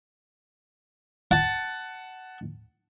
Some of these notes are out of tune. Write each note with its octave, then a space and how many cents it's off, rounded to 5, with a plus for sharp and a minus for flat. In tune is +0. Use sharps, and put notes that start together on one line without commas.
F#5 +15 A5 +0